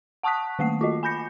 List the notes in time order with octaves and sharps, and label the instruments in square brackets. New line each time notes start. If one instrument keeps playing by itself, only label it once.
[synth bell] F#5 A5 C#6 D#6 F#6 B6
D#3 A3 A#3 C7
F4 F#4 D#5
G#5 B5 G6 A#6 C#7